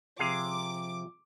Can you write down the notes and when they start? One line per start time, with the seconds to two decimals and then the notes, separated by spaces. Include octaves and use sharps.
0.19 C3 F3 G#4 F5 D6